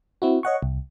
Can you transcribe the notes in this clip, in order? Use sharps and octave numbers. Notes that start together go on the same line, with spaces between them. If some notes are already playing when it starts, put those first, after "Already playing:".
C4 E4 F#4
C#5 D#5 F#5 C#6
C2